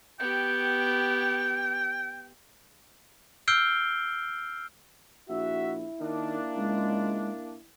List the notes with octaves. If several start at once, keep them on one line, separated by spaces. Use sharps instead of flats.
B3 G4 G5
E6 F6 G6 C7 D7 G7
A#1 E4 F#4 E5
D#3 A#3 D4
C#2 G#3